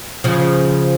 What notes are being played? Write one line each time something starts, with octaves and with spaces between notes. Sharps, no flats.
C#3 F3